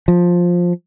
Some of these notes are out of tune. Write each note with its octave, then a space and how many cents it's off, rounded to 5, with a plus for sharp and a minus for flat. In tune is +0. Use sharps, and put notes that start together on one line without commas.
F3 +10